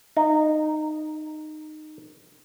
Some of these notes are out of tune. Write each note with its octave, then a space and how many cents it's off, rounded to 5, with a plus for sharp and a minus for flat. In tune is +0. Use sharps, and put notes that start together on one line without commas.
D#4 -15